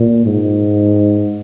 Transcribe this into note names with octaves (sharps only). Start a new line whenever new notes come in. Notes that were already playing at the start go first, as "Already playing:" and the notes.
Already playing: A#2
G#2